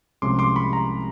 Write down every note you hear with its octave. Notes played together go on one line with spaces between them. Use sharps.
C2 C3 F3 G#3 C#4 C6 D6
C6 D6
B5 C#6
A#5 C6